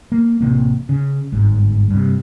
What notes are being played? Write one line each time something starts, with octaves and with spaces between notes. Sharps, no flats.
A#3
A1 C3 A#3
C#3
G1 G#2
G2 C3